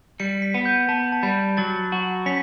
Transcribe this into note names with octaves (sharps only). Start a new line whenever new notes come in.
G3 C#7
B6
B3
G6
B3 A5
A5
G3 B5
F#3 A6
F#4
C#4 B6